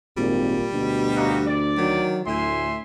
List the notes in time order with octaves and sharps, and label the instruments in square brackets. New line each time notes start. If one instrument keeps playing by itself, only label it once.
[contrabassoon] G#1 [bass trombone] A#2 [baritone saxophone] G3
[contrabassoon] D2 [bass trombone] B2
[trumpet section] A#3 D#4 F#4
D5
[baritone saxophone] D#3 [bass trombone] F#3
[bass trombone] D2 [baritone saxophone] A2 [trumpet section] E5 G#5 C6